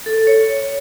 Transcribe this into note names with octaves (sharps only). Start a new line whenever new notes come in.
A4
C#5